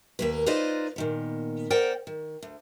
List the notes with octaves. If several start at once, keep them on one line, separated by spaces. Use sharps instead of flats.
D#2 A#3 B4
D#4 F4 B4 C5 D5 D#5
A#2 D#3 B3
A#4 C5 D5 F#5 G5
D#3
D2